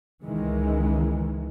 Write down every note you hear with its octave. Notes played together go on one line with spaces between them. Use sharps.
C#2 D#3 E3 G#3